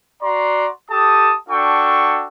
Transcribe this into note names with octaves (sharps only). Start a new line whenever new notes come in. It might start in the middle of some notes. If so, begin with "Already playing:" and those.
F#4 D5 A#5 C6
G4 A4 A5 D#6
D4 F#4 A4 G5 C#6